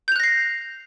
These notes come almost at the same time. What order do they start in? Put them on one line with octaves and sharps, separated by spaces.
G6 F7 F#6 A#6 C7